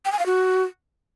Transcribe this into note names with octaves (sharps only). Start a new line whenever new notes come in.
G5
G#5
F5
F#4